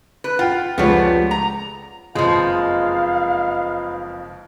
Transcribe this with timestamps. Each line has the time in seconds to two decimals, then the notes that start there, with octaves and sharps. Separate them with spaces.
0.24 B4
0.39 F4 F#5 G5
0.78 C#2 F3 G3 A3 B3 C#5
1.31 A#5
2.15 F#1 F2 F3 G#3 D#4 B4 D#5 F5